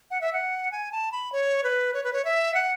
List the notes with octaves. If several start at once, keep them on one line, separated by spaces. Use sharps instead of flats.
F#5
E5
F#5
G#5
A5
B5
C#5
B4
C#5
B4
C#5
E5
F#5